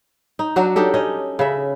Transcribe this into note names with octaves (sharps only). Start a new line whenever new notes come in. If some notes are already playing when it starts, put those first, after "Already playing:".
D#4
F#3 D4 F#4
D4 D#4 G4 A4
C#4 D#5
C#3 B4 E5